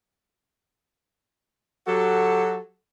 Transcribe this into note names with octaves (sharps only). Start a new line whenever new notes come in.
F#3 F#4 G4 A4